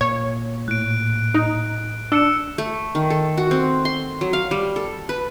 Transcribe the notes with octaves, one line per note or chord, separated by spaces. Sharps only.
A#2 C#5
A2 F#6 D7
D#4
D4 E6 C#7 E7
A3
D#3
A4
F#4
C4
C6
F#3
F5
G3
A4
B4